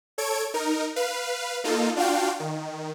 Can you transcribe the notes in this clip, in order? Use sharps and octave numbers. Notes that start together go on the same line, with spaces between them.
A4 C#5 G#6 D7
D#4 A#4
B4 F5
A#3 D#4 F4 A4
D4 F4 F#4 F5 G5
D#3